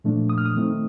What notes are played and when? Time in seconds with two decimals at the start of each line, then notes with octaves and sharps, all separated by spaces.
0.04 A#2 F3 A3 D4
0.30 D#6
0.38 F6
0.46 D#6
0.55 D#3 A3 C4 D#4